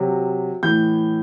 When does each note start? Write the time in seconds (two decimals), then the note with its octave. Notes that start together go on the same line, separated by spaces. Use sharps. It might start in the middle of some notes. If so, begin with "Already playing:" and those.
Already playing: C3 F#3
0.63 A2 E3 G6